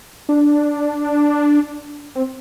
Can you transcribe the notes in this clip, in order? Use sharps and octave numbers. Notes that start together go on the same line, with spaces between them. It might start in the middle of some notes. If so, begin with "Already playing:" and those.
D4
C4